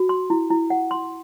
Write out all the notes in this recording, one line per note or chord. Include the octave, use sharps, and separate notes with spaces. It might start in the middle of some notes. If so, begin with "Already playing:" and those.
Already playing: F#4
C6
E4
E4
F#5
C6